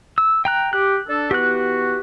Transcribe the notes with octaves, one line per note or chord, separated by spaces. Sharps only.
E6
G5 A#5 F#6
G4 F#6
D4 A4
E3 B3 F#4 G4 F#6